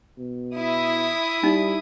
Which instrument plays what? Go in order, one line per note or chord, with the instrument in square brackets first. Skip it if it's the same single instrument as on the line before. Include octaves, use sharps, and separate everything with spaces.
[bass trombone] B2
[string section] E4 D#6
[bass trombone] G3 [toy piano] D#4